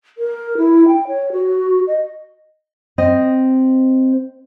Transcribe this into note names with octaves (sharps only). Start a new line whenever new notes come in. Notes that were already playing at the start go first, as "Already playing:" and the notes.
A#4
E4
G5
C#5
F#4
D#5
C4 C5 D#5